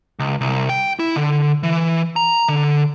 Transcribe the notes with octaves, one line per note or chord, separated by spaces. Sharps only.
C#2
C2
G5
E4
D3
E3
A#5
D3